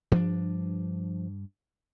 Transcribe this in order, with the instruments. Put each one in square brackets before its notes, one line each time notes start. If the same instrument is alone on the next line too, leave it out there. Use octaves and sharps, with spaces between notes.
[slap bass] G2 D4 [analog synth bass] F3